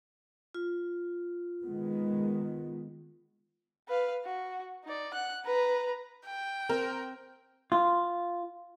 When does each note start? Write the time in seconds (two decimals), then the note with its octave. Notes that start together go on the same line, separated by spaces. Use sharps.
0.55 F4
1.64 D#3 G#3 B3
3.88 B4 F5
4.25 F#4
4.84 D#4 D5
5.14 F#5 F#6
5.44 B4 A#5
6.25 G5
6.69 C4 A#4
7.72 F4